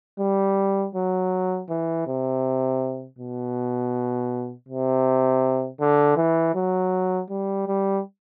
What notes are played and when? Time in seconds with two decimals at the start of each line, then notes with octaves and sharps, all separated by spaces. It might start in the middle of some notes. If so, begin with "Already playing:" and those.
0.19 G3
0.95 F#3
1.69 E3
2.07 C3
3.19 B2
4.68 C3
5.80 D3
6.17 E3
6.55 F#3
7.30 G3
7.67 G3